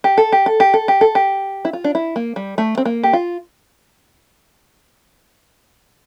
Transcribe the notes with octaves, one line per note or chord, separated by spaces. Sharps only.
G4
A4
G4
A4
G4
A4
G4
A4
G4
E4
F4
D4
E4
A#3
G3
A3
C4
A#3
G4
F4